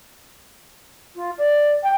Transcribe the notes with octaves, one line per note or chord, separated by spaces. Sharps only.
F4
D5
G5